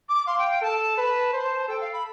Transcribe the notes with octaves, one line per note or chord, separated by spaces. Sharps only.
D6
F5 C6
G5
G5
A4 A5
B4 A5
C5
A4 G5
F5
B5